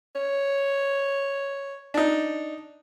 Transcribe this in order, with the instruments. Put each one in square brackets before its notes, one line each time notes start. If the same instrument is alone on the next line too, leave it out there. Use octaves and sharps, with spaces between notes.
[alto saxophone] C#5
[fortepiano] D4 D#4